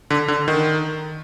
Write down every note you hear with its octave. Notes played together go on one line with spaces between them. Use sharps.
D3
D3
D#3